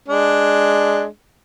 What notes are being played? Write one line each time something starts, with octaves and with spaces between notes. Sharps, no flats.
G#3 D4